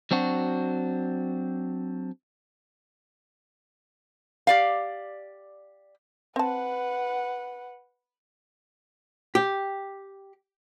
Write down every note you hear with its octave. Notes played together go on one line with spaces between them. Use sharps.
F#3 C4 D4 F#4
G4 D5 F5
C4 B4 F#5 A5
G4